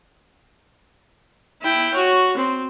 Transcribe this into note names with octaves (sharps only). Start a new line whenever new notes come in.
E4 G5
F#4 C#5
C4